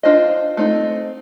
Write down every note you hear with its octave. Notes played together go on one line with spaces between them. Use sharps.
D4 F4 C5 D#5
A3 C4 D#4